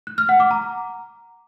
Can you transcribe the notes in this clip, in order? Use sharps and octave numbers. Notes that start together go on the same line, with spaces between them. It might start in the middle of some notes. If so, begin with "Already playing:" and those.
F#6
F6
F#5
D6
A#5